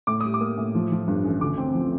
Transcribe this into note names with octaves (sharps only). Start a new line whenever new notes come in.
A2 D6
G3 D#6
D6
A#3
A2
F3
F3
G2
A1
D2 D6
C4
F3